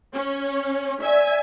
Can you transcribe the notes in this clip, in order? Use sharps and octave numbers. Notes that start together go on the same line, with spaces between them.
C#4
D5 E5 G#5